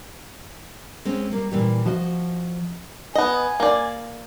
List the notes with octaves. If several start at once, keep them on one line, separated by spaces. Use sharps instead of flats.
G#3 C4 C#4
G3 A#3
A#2 E3 G3
F3 F#4 D#5
B3 D#5 G#5
A#3 D5